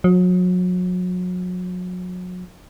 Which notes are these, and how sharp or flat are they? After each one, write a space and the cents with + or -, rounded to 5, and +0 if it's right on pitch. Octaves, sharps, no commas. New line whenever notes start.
F#3 -35